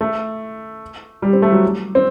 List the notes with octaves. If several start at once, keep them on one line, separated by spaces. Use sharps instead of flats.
A3
G3
C4
A3
F#3
C4